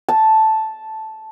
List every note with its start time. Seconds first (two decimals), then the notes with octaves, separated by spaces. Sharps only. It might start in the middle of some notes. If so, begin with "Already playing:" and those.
0.09 A5